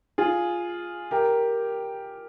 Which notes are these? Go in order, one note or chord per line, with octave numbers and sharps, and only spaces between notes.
F4 G#4
G4 A#4